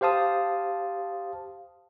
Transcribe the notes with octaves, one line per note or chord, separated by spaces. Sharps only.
G4 C5 F5 A5 D#6